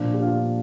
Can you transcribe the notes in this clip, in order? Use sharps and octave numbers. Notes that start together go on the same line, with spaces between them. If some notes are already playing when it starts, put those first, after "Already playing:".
Already playing: A#2 F3 D4 F4
G4
D4 F4